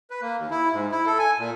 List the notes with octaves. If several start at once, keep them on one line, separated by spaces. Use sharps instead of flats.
B4
A#3
D#2
E4
G#2
E4
A4
G#5
A#2